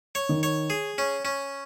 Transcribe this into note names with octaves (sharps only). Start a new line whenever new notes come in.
C#5
D#3
C#5
G#4
C#4
C#4